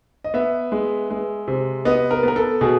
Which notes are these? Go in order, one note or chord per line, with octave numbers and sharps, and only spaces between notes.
D#5
B3 E5
G#3
G#3
C3
B3 D#5
A#4
B3 A#4
A4
B2 G#4